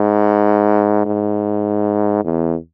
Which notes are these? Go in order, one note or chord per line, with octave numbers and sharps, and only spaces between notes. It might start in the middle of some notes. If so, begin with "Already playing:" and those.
Already playing: G#2
G#2
E2